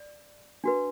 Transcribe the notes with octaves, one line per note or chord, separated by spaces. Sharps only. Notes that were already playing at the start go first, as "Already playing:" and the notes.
Already playing: D5
D4 F#4 B4